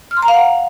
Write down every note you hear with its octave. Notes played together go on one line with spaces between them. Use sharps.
F6
C6
A#5
F5
F#5